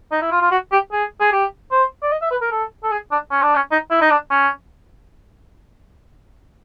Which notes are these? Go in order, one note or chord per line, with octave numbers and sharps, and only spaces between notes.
D#4
E4
F4
F4
F#4
G4
G#4
G#4
G4
C5
D5
D#5
E5
B4
A#4
A4
A4
G#4
D4
C#4
D4
C#4
D#4
E4
D#4
D4
C#4